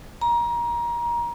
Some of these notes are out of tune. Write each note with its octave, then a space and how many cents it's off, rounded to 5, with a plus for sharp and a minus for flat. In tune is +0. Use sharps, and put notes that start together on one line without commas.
A#5 +25